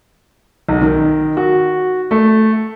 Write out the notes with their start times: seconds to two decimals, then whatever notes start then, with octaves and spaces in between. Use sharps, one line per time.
0.69 B1
0.82 D#3
1.37 F#4
2.11 A3